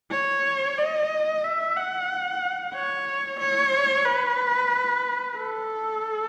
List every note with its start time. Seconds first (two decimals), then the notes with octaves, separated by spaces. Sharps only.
0.11 C#5
0.78 D#5
1.44 E5
1.77 F#5
2.75 C#5
3.40 C#5
4.06 B4
5.37 A4